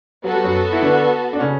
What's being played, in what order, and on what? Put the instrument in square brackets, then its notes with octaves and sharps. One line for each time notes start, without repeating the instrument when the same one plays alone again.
[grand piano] F#3 [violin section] B3 F#4 A4
[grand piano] G3
F#2 F#3
E4
D3 D4
D4
C#3 C#4